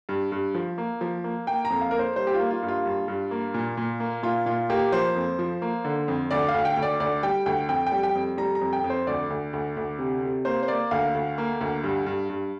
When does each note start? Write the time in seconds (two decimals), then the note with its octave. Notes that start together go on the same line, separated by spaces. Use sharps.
0.09 G2
0.32 G2
0.55 F3
0.78 A#3
1.01 F3
1.24 A#3
1.47 A#3 G5
1.65 A#5
1.70 F2
1.81 F5
1.91 A#3 A#4
1.99 C5
2.16 G3 C5
2.27 G4
2.34 F4
2.39 A#3
2.51 F4
2.63 G2
2.68 F4
2.85 G2
3.08 G2
3.31 A#3
3.54 A#2
3.77 A#2
4.00 A#3
4.23 A#2 F4
4.46 A#2 F4
4.70 A#3 G4
4.92 F3 C5
5.16 F2
5.39 F3
5.62 A#3
5.85 D3
6.08 F2
6.31 D2 D5
6.48 F5
6.54 D2
6.65 G5
6.77 D2
6.82 D5
7.00 D2 D5
7.23 G3 G5
7.46 D2 G5
7.69 F2 G5
7.87 G5
7.92 G3
8.03 G5
8.15 F2
8.37 G3 A#5
8.55 A#5
8.61 F2
8.73 G5
8.84 F2
8.90 C5
9.07 D2 D5
9.30 D2
9.53 D2
9.77 D2
9.99 C3
10.22 C3
10.45 A#3 C5
10.63 C5
10.68 A#3 D5
10.91 D2 F5
11.14 D2
11.38 A#3
11.61 D2
11.84 G2
12.06 G2
12.29 G2